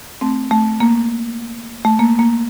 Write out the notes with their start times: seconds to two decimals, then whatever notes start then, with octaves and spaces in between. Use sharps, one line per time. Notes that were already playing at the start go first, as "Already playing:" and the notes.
0.21 A3 C4
0.51 A3
0.80 A#3
1.85 A3
1.99 A#3
2.19 A#3